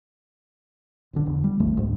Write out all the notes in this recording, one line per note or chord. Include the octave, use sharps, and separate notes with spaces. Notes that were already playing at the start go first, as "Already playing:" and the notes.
F#1 B1 D3
E1
G3
D#1 G#1 D#2 A3
D2 G#2